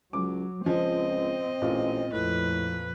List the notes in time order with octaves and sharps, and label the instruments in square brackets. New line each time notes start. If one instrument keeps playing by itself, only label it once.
[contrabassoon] C#2 [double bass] F#3 [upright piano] D6
[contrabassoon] C#2 [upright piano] F3 [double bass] C4 [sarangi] D#5
[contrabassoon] A1 [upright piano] A#2
[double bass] A#1 F2 [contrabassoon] A2 [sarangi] B4